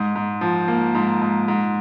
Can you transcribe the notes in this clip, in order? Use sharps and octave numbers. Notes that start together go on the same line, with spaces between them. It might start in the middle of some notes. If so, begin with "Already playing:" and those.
Already playing: G#2
G#2
F3
A#3
G#2
G#2
G#2